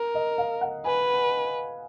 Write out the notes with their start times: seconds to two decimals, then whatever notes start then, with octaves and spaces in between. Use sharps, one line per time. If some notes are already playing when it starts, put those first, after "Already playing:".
Already playing: A#4
0.15 D#5
0.38 F5
0.61 F#5
0.85 B4 G#5